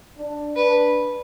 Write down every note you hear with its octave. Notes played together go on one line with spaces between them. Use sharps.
D4
D4 B4